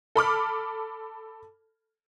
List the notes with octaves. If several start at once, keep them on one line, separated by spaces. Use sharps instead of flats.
A4 B5 D6 F6